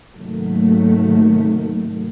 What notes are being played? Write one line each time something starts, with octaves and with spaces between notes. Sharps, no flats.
G#2 C3 D#3 F#3 A3 A#3